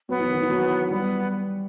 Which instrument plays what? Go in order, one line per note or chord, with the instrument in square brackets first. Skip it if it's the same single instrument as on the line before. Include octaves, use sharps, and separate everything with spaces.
[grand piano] F#3 [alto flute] B3
[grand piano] E3
D#3
E3
F#3
[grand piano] G3 [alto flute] B3